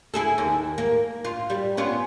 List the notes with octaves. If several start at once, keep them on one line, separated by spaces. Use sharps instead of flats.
E4 G#4 A4
D#2
A#3
F4
G3
B3 C#4 F4